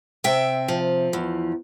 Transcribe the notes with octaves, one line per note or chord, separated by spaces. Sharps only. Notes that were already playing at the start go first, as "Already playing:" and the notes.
C3 E5 G5
F3
E2